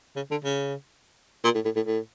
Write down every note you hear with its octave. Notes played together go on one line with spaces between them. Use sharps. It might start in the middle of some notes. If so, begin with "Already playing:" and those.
C#3
D3
C#3
A#2
A2
A2
A2
A2